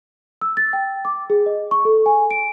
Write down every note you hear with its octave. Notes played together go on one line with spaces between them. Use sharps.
E6
A6
G5
D6
G#4
D#5
C#6
A4
G#5
D7